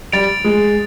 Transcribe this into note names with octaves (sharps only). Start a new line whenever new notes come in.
G3 A6 D7 F7
G#3